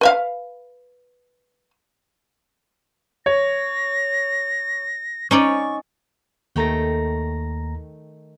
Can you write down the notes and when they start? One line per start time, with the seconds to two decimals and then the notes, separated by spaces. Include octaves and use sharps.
0.01 B4 E5 F5
3.26 C#5 A#6
5.31 C#4 D#4 D5 C#6
6.56 D#2 D#3 A3 G5 A#5 A#6